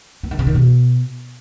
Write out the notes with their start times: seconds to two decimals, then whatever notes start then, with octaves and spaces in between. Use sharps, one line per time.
0.23 E3
0.31 D#3
0.39 C#3
0.47 D#3
0.55 B2